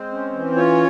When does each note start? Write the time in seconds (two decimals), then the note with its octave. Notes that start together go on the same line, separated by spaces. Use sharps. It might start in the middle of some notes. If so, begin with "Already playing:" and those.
Already playing: G#3 C4 C5
0.12 C#4
0.33 E3
0.55 C#4 F4 C#5